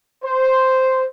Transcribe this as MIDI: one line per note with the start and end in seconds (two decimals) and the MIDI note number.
0.24 1.06 72